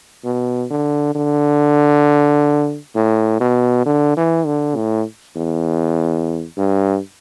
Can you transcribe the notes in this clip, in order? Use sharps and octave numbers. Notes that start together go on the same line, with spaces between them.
B2
D3
D3
A2
B2
D3
E3
D3
A2
E2
G2